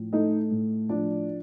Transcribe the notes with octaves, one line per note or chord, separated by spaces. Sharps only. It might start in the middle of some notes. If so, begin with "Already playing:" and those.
Already playing: A2 F3
A3 D#4 D#5
A2
F3 D4 D5